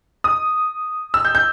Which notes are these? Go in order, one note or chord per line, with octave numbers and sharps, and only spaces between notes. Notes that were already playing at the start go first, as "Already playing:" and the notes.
D#6
E6
G6
G6